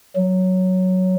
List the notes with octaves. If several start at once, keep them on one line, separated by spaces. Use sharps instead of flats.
F#3